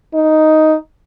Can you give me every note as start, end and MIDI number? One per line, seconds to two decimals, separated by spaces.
0.14 0.76 63